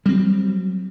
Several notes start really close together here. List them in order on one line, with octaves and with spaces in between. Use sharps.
G3 C4 F#3